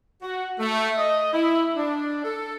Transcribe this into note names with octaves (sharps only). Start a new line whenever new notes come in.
F#4
A3
D#5
E4
D4
A4